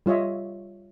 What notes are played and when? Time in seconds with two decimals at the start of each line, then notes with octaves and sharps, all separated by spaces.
0.06 G3 F4 C#5 D#5 E5